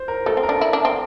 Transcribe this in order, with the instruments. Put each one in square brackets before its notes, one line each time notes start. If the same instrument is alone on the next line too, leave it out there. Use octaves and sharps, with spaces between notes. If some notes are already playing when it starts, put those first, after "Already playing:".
Already playing: [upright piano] C5
A#4
[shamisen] A3 [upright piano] A4
[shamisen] C4
[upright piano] A#4
[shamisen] D4
E4
D4
C4